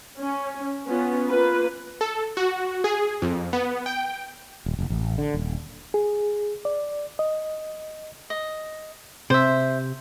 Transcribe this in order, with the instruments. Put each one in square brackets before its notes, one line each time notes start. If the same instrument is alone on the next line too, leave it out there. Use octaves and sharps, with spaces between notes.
[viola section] C#4
B3 C#4 F4
A#3 F4 B4
[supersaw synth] A4
F#4
G#4
F2
B3
G5
[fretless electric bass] D#1
F1
A1
D3
D#1
[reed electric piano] G#4
D5
D#5
[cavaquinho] D#5
[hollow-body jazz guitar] C3 [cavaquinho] C5 E5